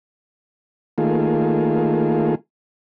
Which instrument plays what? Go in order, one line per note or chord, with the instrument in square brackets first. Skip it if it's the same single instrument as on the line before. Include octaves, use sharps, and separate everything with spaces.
[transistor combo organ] D#3 A3 A#3 F4 G#4